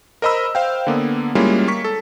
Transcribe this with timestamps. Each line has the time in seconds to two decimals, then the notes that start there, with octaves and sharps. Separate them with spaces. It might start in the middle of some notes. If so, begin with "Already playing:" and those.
0.22 A#4 C5 D#5 A#5 B5 E6
0.55 C5 F5 G5
0.87 D3 A#3 B3
1.35 G3 G#3 A#3 C#4 E4 F4
1.67 A#3 C#6 B6
1.84 A4